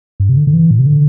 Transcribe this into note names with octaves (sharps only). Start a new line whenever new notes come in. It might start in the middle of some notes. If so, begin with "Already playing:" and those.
G2
C3
D3
D3
E3
A2
C3
D3